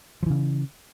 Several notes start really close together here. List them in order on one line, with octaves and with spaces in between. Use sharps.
F3 E3 C#3